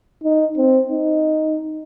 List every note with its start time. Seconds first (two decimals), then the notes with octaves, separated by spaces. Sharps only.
0.23 D#4
0.57 C4
0.92 D#4